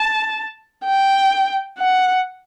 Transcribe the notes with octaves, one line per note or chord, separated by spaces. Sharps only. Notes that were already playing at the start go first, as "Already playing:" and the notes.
Already playing: A5
G5
F#5